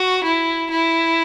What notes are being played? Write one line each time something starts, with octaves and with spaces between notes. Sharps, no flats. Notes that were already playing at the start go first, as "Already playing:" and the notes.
Already playing: F#4
E4
E4